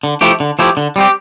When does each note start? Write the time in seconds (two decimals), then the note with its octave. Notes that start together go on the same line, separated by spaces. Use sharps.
0.03 D3
0.21 F3 A3 E4 G4
0.40 D3
0.59 F3 A3 E4 G4
0.77 D3
0.96 G3 C4 G4